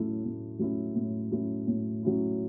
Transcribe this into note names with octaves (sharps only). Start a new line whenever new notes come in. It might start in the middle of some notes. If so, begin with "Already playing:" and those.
Already playing: A2 F#3 A3 C#4 E4
A2
F#3 A3 C#4 E4
A2
F#3 A3 C#4 E4
A2
F#3 A3 C#4 E4